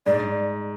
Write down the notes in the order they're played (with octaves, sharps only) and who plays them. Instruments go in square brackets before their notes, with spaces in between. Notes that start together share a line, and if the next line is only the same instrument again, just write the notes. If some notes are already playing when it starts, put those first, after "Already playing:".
[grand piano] G#2 [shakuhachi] D5